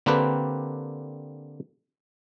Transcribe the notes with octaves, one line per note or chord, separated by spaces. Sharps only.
D3 A#3 C4 D4 G4 B4